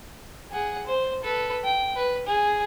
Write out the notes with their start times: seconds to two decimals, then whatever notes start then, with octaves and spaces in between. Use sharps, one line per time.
0.52 G#4 F#5
0.86 C5
1.23 A4 B4
1.64 G5
1.96 B4
2.27 G#4